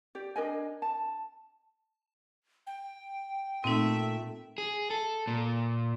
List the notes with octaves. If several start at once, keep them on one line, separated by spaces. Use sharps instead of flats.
G4 D5
D4 A#4 D#5 G#5
A5
G5
A#2 A3 C4 D#4 E5
G#4
A4
A#2